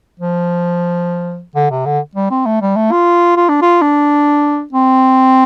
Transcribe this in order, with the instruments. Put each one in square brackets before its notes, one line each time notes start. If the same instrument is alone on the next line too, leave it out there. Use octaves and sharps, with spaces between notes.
[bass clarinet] F3
D3
C3
D3
G3
C4
A3
G3
A3
F4
F4
D4
F4
D4
C4